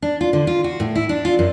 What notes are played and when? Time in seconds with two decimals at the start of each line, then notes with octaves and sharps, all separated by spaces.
0.02 D4
0.21 F4
0.33 D3
0.47 F4
0.64 F#4
0.80 A2
0.95 E4
1.09 D4
1.25 F4
1.39 F#2